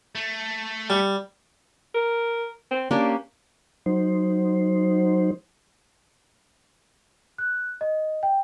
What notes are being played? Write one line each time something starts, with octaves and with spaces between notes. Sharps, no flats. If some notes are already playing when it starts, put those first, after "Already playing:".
A3
G3
A#4
C4
A#3 C#4 D4 G4
F#3 D#4 C5
F#6
D#5
G5